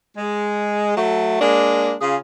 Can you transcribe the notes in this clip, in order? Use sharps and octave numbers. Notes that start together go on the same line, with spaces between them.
G#3
F#3 A3
G#3 A#3 D4
C#3 F4 G#4